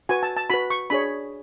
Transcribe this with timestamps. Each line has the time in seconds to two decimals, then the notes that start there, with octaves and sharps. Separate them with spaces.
0.09 F#4 B4 G#5
0.23 A5
0.37 A5
0.50 F#4 B4 B5
0.70 C#6
0.90 D4 G#4 C#5 B5